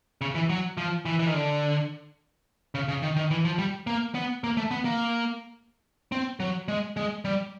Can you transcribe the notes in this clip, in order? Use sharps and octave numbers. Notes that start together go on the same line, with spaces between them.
C#3
E3
F#3
F3
E3
E3
D#3
D3
C#3
C#3
D#3
D#3
E3
F3
G3
A#3
B3
A#3
A3
B3
A#3
C4
F#3
G#3
G#3
G3